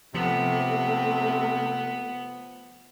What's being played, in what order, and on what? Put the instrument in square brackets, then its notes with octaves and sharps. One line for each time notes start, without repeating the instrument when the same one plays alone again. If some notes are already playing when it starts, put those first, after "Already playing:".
[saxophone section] C3 [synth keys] F3 [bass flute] A3 [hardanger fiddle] B3